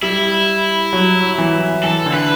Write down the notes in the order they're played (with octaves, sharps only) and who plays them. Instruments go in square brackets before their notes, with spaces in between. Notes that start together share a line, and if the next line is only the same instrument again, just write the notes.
[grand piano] G3 [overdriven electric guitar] E4
[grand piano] F#3
E3
[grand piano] E3 [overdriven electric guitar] A4
[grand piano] D3
[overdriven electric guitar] B4